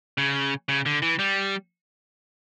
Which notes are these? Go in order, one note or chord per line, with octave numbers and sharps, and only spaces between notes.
C#3
C#3
D3
E3
G3